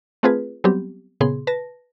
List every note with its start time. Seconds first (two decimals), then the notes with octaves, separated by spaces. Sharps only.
0.23 A3 C4 F4 G#4 B4
0.64 F#3 G3 B3 C4 G4
1.20 A#2 C#3 B3 G#4 C6
1.47 B4 A5 A#6